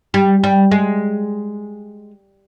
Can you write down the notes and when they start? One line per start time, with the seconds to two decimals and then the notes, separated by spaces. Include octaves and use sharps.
0.14 G3
0.44 G3
0.71 G#3